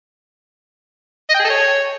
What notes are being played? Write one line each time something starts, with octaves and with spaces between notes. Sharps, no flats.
D#5
G5
G#4
A4
C#5